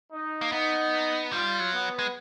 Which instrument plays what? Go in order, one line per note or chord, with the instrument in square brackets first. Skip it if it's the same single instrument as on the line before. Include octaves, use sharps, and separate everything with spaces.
[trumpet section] D#4
[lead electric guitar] A#3
[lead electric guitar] B3 [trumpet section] D#4
[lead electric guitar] G3 [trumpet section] F4
[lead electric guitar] F#3
[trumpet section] B3
[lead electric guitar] G#3